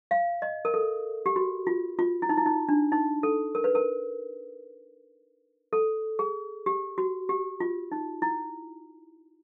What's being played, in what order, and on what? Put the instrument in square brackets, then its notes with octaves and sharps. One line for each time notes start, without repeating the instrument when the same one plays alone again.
[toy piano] F5
D#5
A#4
A4
G4
F#4
F4
F4
E4
D#4
E4
D#4
D4
D#4
A4
A#4
B4
A#4
A4
G#4
G4
F#4
G4
F4
D#4
E4